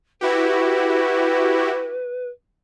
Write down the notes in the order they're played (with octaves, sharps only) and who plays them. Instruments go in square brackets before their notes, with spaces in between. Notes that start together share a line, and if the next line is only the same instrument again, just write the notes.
[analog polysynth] E4 F#4 G4 [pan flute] B4